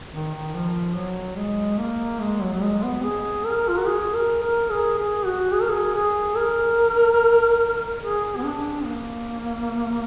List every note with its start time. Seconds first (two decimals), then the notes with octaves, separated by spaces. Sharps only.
0.13 D#3
0.34 D#3
0.54 F3
0.96 F#3
1.37 G#3
1.79 A#3
2.21 G#3
2.41 F#3
2.53 F#3
2.63 G#3
2.83 B3
3.03 G#4
3.45 A#4
3.69 F4
3.78 F#4
3.87 G#4
4.14 A#4
4.42 A#4
4.70 G#4
4.98 G#4
5.25 F#4
5.53 G#4
5.61 A#4
5.71 G#4
5.94 G#4
6.37 A#4
8.02 G#4
8.36 B3
8.44 D4
8.85 A#3